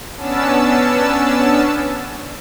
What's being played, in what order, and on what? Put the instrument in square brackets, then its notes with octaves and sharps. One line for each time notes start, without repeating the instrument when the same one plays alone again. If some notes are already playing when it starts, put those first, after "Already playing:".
[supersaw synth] B3 C#4 D4 A5 E6